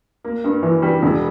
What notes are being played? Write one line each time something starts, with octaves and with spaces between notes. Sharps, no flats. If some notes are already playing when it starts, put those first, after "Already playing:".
A#3
G2
E3
G3
E1